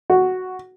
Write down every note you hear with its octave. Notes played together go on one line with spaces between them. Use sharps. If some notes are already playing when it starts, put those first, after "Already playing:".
F#4